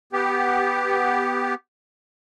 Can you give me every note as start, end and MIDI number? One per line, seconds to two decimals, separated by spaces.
0.13 1.54 59
0.13 1.54 67